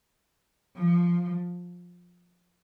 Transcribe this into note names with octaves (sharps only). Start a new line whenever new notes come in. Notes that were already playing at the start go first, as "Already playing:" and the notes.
F3